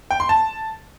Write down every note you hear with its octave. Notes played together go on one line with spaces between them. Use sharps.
G5
C6
A5